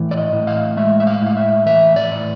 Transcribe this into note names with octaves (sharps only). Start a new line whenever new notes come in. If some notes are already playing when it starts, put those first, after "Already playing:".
Already playing: A2 E3
D5
D#5
A2
F5
G#3 E5
E5
F5
A2 F5
E5
E3 E5
D5
A2